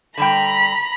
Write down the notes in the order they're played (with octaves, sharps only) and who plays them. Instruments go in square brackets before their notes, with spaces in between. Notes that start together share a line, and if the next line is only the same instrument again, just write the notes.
[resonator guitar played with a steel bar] D3 G3 G5 [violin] A#5 B5